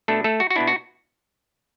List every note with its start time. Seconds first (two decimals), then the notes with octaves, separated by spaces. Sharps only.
0.08 B2 A3 D4 A4
0.24 A3 A4
0.40 F#4
0.50 F#4
0.56 B2 B3 D4 E4
0.67 F#4